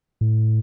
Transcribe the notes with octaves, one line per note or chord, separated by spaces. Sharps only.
A2